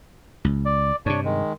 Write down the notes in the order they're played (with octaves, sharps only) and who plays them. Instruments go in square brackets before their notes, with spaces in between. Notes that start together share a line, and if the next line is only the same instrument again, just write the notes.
[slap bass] C#2
[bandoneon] D5
[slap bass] G2 C3 [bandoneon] D4 C#5
[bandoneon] D#3 G#3